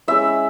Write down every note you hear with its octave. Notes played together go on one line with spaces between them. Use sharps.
G#3 C#4 E4 E5